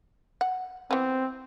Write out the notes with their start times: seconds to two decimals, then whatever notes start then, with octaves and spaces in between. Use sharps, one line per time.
0.41 F#5
0.91 E3 B3 C4